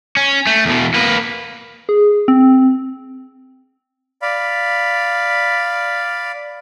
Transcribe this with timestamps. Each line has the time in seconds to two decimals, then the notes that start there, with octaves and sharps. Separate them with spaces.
0.17 C#4
0.47 A3
0.65 E2 B2
0.94 A#3 B4
1.89 G#4
2.28 C4
4.22 D5 F5 B5